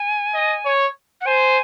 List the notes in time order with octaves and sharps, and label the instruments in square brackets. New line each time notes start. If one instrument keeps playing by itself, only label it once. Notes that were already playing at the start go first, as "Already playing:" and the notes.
Already playing: [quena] G#5
[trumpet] D#5
C#5
[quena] F#5
[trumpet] C5 [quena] G#5